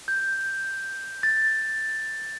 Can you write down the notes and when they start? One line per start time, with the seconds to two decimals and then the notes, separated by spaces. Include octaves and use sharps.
0.08 G6
1.23 A6